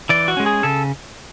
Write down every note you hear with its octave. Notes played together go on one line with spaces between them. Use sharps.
E3 D5
F#4
G#3 C#4
G#4
C#3 A4